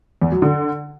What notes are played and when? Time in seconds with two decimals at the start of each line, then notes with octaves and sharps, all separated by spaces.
0.22 E2
0.32 F#3
0.42 D3